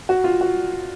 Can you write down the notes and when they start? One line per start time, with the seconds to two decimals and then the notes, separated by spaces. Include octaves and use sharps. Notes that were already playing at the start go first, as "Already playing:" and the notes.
0.09 F#4
0.24 F4
0.41 F#4